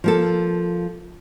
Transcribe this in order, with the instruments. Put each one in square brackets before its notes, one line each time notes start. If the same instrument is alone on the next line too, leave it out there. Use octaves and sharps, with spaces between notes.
[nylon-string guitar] F3 A#3 A4